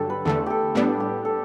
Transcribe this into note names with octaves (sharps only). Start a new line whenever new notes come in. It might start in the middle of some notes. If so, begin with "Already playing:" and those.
Already playing: G2 D3 F#3 G4 A4
B4
E2 D3 A3 A4
G4 A4
A2 G3 B3 D4 G4
G4
A4